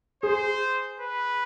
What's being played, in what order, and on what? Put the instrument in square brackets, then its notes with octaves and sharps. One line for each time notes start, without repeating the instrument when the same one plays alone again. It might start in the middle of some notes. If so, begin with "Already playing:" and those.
[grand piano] G#4 [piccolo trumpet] C5
[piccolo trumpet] B4